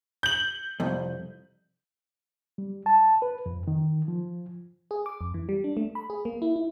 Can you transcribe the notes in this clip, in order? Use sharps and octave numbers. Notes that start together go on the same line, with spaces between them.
G6 F#7
C2 F2
G3
A5
B4
F2
D#3
F3
G#4
D6
F2
E3
G3
D4
A3
B5
G#4
A#3
E4
E4